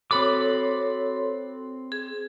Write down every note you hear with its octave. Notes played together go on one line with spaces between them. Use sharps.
C4 F#4 A4 C#5 B5 D6
G#4